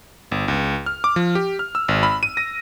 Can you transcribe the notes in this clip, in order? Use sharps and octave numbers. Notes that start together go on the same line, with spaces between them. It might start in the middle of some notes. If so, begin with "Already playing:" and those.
G1
C#2
F6
D6
F3
G4
F6
E6
G#1
B5
D#7
A#6